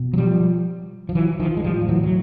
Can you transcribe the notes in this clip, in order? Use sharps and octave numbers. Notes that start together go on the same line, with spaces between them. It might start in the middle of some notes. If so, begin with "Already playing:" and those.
Already playing: B2
F#3
F3 G3
F3
E3 F#3
D#3 F3
G#3
A2 F3 G3
F3
E3 F#3
F#3